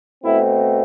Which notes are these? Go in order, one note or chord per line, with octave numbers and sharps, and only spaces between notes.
B2 A3 C4 E4